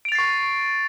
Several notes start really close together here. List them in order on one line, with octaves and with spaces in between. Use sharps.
D7 F7 A6 C7 C#6